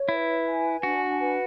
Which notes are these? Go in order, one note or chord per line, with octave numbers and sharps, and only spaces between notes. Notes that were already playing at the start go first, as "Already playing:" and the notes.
Already playing: C#5
E4 B4
G#5
D4 F#4
B4